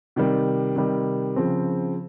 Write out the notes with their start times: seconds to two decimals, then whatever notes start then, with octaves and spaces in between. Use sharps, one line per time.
0.16 C3 D#3 G3
0.76 C3 D#3 G3
1.36 C#3 F3 C4